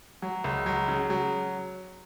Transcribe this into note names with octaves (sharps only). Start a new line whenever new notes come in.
F#3
C#2
F#3
C#3
F#3